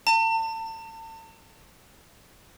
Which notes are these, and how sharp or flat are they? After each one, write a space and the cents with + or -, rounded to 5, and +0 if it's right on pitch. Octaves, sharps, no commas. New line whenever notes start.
A5 +35